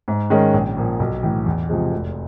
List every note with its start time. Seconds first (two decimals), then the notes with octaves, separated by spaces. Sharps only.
0.08 G#2
0.30 D#3 G#3 C#4
0.54 A#1
0.77 A#2 F3
1.00 B1
1.23 A2 E3
1.46 E2
1.69 C3 F3 G#3
1.92 F1